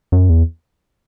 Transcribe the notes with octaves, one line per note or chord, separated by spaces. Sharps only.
F#2
E2